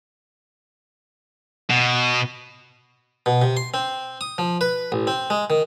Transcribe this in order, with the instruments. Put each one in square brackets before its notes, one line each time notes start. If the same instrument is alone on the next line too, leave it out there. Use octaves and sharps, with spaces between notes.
[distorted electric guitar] B2
[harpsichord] B2
C3
C6
C4
D#6
F3
B4
A1
C4
G#3
D#3